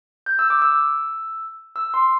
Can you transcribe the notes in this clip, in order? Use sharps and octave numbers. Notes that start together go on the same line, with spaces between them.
G6
E6
D6
E6
E6
C6